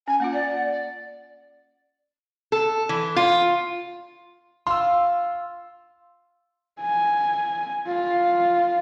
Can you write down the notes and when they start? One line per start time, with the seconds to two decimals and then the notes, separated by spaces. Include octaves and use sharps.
0.08 C#4 G#5
0.20 A#3 C#4 F4 F#5
0.33 D5
0.71 D5
2.52 A4
2.89 E3
3.16 F4
4.67 F4 C6 E6
6.81 G#5
7.87 F4